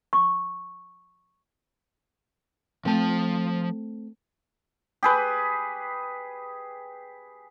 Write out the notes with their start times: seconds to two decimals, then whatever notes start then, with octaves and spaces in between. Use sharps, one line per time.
0.13 C#6
2.85 F3 A3 C4 A5
5.03 G4 G#4 B4